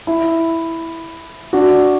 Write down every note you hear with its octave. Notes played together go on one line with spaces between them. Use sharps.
E4
D4 F#4